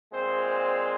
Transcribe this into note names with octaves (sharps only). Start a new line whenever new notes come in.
A#2 G#3 C4 C5
C5